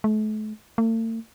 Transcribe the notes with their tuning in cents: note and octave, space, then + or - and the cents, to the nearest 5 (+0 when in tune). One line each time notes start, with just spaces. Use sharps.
A3 -40
A3 +45